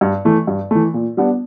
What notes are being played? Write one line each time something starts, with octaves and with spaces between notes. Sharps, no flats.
G2
E3 A3
G2
E3 A3
A#2
G3 B3 D4